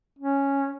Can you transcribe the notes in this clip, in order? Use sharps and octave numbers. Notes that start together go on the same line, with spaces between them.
C#4